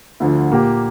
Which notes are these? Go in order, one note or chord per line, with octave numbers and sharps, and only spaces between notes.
D2 D3 F3
A#2 A#3 G4